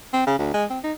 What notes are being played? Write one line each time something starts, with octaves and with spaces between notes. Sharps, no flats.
C4
C#3
D2
G#3
C4
D#4